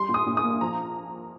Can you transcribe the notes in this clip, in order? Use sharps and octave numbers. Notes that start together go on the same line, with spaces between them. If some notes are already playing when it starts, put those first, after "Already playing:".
Already playing: G3 C6
A#2
D#6
A#2
D#6
A#3
F3 A#5